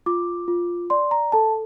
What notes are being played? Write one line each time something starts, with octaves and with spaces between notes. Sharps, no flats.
F4 D6
F4
D5 C6
A#5
A4 A5